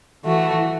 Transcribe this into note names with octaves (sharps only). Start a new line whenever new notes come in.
E3 A3 F#4